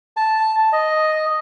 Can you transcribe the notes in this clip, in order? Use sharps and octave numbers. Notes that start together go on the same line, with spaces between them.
A5
D#5